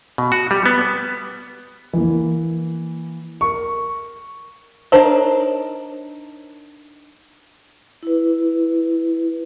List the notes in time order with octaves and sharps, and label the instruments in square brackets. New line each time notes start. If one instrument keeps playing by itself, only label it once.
[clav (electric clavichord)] B2
F#4
G3
B3
[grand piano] E3 A#3
A#4 C#6
[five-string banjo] D4 D#4 A#4 C5 C#5
[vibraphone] E4 B4